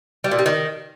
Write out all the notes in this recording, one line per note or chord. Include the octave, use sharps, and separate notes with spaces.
G3
A#2
G3
D#3